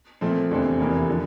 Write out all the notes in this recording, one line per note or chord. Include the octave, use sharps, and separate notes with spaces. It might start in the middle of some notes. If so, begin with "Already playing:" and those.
A#2 F3 A3 C4
F1 E2 D3 A3 C4
F1 E2 C3 E3 A#3
D3 F3